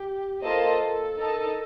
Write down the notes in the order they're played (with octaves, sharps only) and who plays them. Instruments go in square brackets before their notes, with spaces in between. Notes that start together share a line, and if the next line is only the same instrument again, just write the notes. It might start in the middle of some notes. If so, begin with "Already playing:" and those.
Already playing: [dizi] G4
[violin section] A#3 F4 C5 D#5 A5 [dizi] A4
[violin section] D#4 A#4 D#5 A5